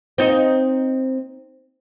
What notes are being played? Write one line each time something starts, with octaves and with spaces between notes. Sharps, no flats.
C4 D#4